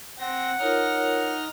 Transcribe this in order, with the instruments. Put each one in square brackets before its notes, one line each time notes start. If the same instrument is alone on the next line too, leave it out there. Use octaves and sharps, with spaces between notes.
[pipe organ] C4 A#6 [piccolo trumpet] F#5
[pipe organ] D#4 F6 A#6 [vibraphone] F4 A#4 C#5